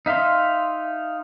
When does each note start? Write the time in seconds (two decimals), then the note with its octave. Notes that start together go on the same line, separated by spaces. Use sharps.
0.06 D#4 E5 F5 C6